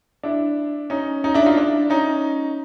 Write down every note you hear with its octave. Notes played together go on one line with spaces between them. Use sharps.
D4 E4
C#4 D#4
C#4 D#4
D4 E4
D#4 F4
D4 E4
C#4 D#4